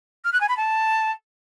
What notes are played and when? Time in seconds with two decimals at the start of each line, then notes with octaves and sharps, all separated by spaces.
0.24 F6
0.33 F#6
0.41 G#5
0.49 B5
0.57 A5